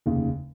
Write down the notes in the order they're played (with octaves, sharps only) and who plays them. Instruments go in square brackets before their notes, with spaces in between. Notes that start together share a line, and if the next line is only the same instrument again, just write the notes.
[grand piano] F1 D#2 C#3